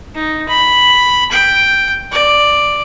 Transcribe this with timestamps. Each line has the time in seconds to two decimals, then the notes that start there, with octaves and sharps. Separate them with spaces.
0.15 D#4
0.48 B5
1.31 G5
2.12 D5